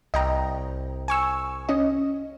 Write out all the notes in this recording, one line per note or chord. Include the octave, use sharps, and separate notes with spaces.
C2 D#5 G5 A#5
G#5 C#6 E6
C#4 D#5